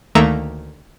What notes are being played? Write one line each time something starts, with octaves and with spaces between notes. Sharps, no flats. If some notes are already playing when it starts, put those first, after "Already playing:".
D2 D#3 A3 A#3 E5 A#5